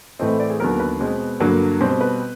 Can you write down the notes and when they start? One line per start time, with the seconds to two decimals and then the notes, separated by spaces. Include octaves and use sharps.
0.19 A2 E3 A3 C4 D#5
0.40 D5
0.50 G#4
0.60 D#2 D3 F#3 B3 A#4
0.80 B4
1.00 B2 G#3 C4
1.40 G2 D3 F#3 A#3
1.81 B2 G3 C4 C5
2.01 B4